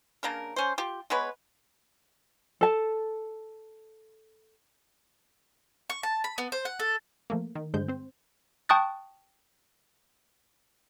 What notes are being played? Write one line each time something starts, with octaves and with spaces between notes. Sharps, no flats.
C#3 A#3 D4 A#4
C#4 C5
F4 G4
G#3 B3 B4 C#5
A4 A5
C#6
A5
B5
B3
C5
F#5
A4
F3 A3 A#3
D#3
G2 D3 G#3 C5 G6
C4 C5
G5 A5 C#6 D#6 F#6 A6